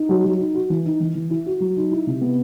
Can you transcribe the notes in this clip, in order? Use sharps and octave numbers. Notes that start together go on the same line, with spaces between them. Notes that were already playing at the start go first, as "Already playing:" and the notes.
Already playing: D#4
F#3
F#3
D#4
F#4
E3
D#4
E3
E3
E4
F#4
F#3
D#4
E4
C3
B3